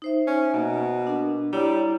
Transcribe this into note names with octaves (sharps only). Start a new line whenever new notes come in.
D#4 C5 E5
C#4
B2 A#3
D4 A#4
G3 E4 C#5 A#5